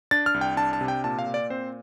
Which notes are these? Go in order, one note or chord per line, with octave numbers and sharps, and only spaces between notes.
D4 A6
F6
C2
G5
D4 A5
A5
C3
G5
A#2 A5
F5
A#2
D5
C4 C5